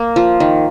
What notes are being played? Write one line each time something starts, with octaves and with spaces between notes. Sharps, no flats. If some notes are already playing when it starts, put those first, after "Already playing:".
Already playing: A#3
F3
D#3